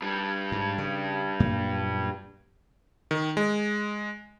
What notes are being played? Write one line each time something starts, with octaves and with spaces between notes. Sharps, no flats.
G2 G3
G#2
C#3
F#2 A#2 A#3
D#3
G#3